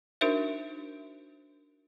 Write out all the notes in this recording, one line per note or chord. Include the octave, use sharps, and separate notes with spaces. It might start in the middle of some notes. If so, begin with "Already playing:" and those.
D4 D#4 F#4 A#4 C5 E5